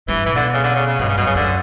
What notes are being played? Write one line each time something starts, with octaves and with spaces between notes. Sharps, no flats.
G2 E3
B2 E3
D3
C#3
D3
C#3
C#3
G2 B2
C#3
F#2 B2
C#3
F#2 D3